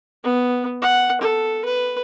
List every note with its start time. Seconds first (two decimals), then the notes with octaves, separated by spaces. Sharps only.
0.24 B3
0.82 F#5
1.21 A4
1.65 B4